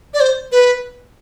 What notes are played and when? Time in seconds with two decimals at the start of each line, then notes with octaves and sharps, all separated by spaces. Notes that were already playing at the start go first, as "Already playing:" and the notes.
0.14 D5
0.20 C5
0.52 B4